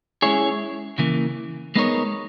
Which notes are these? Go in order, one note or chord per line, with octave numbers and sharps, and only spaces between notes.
G#3 C#4 E4 G#4 C#5
C#3 E3 A#3
G#3 B3 D#4 A#4 C#5